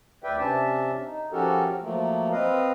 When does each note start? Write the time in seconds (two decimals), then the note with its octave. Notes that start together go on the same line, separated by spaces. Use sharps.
0.24 D2 B4 D5 E5 G5
0.39 C3 C#4 D4 E5 A5
1.05 D#4
1.32 F3 C#4 F#4 G4 A4 A#4
1.83 F3 F#3 A3 A#3
2.32 C4 B4 D#5 F5